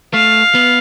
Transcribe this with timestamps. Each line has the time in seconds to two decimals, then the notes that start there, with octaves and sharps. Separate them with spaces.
0.14 A3 F5
0.55 B3